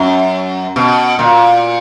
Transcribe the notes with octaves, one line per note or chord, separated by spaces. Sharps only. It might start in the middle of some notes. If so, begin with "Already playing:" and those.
Already playing: F#2
B2
A#2